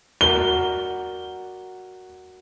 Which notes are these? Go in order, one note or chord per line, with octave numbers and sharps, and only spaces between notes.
F#4 A#4 D5 G7